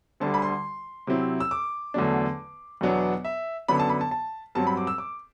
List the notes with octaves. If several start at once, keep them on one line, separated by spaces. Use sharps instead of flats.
D2 D3 G3 D4 A5
B5
C6
C3 F#3 C4 E4
E6
D6
E2 D3 F#3 A3 D4
E2 B2 F#3 B3 D4
E5
F#2 D3 F#3 B3 D4 B5
A5
B5
A5
A5
G2 F#3 C4 A5
B5
D6
E6
D6